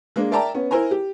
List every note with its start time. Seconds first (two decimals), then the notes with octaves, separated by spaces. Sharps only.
0.16 G#3 A#3 D4
0.32 A#4 D5 E5 G5 A5 A#5
0.54 B3 C#4
0.71 E4 A#4 C5 G#5 A#5
0.91 G4